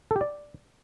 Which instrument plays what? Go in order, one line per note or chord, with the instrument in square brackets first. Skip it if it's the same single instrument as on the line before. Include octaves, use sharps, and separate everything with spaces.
[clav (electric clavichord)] A4
G4
D5